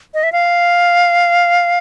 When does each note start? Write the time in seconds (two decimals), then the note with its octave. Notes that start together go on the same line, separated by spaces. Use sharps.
0.14 D#5
0.23 E5
0.32 F5